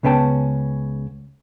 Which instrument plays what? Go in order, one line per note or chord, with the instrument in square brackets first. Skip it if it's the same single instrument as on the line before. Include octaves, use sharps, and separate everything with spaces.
[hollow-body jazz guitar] C#2 C#3 B3 C#4 G5 A5